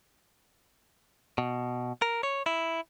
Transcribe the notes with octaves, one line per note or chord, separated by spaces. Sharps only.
B2
A#4
C#5
E4